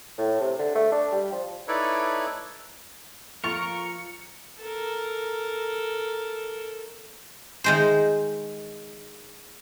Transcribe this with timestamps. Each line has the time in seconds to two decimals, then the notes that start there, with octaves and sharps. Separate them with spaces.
0.18 A2
0.40 C3
0.59 D3
0.75 A3
0.92 D4
1.12 G3
1.32 F3
1.68 D#4 E4 A4 B4 C#5 D5
3.44 F3 F4 A#4 C#6 A6 C#7
4.60 A4 A#4
7.64 D#3 G#3 C5